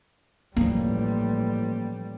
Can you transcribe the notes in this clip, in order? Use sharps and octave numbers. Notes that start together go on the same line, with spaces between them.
A1 F3 G3 A#3